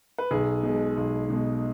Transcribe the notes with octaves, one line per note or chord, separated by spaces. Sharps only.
B4
B1 G#4
B2 G#3
B1
B2 G#3